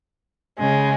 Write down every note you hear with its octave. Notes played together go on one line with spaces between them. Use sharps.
C#3 G#3